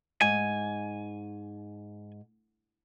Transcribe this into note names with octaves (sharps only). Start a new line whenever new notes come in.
G#2 G#5